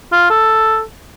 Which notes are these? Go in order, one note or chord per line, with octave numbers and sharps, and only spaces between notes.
F4
A4